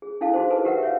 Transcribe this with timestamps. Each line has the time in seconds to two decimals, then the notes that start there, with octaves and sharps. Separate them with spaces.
0.02 G#4
0.21 D4 E4 A4 F5 A5
0.33 D#4 F#4 G#4 C5
0.50 G#4 A4 B4 C5 D#5 G#5
0.65 F#4 G4 A#4 B4 E5 F#5
0.83 C#5 E5 F5